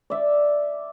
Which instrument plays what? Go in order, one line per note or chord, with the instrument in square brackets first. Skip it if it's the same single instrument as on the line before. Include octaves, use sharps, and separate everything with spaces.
[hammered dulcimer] D5 E5